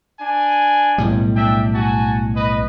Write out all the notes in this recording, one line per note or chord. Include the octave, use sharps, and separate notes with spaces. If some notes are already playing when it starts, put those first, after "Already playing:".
D4 G#5
B1 A2 G3
D4 E5 G5
F#4 G#5 A5
B4 D#5